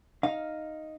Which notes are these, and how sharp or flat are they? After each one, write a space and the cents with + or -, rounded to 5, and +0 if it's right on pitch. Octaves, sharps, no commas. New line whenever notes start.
D#4 +0 F5 +0